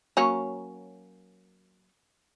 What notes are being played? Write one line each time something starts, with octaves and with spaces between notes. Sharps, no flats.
F#3 A#3 C#4